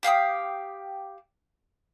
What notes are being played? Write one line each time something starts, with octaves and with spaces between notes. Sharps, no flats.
G4 F5 G5 D#6